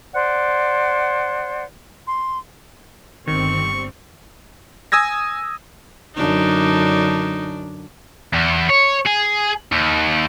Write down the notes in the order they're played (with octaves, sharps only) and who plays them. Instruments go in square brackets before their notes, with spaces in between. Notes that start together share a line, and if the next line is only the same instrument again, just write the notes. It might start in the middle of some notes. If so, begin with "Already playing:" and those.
[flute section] C5 D5 F#5
C6
[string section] G1 G3 C4 [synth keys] D#3 [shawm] C#6
[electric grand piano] G#5 D#6 E6 G#6 A#6
[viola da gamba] F#2 D3 D4 [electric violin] D#4
[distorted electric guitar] E2
C#5
G#4
D#2